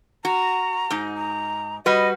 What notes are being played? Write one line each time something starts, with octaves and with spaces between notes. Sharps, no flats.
F#4 A#5
G#2 D#4
A#5
G3 F#4 B4 D#5